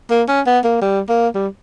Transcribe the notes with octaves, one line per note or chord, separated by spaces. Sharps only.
A#3
C#4
B3
A#3
G3
A#3
G3